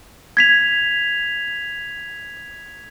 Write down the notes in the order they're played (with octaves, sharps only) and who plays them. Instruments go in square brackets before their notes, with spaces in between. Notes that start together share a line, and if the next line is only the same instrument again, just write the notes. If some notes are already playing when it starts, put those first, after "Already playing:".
[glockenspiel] G#6 B6 F7